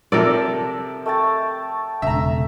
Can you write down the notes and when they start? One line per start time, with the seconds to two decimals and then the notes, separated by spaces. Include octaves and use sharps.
0.12 C3 F3 A4 A#4 D5 E6
1.06 A3 G5 A5
2.02 E1 C#3 E5 A#5